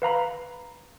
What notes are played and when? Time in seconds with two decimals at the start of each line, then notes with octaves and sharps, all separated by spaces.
0.02 B4 F5 A#5 B5